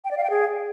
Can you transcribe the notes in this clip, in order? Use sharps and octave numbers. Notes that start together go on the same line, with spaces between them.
G5
D5
F5
G5
G#4